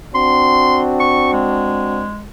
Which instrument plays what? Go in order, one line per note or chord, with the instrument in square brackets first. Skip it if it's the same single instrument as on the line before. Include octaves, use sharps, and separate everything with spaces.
[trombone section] C4 D4 F#4 [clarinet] C6
[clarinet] C#6
G#3